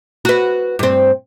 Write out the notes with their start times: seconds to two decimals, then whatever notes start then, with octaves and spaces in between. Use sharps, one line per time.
0.25 F#4 B4
0.79 G2 C4